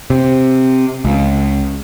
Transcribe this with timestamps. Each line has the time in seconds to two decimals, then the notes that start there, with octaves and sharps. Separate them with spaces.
0.10 C3
1.05 C#2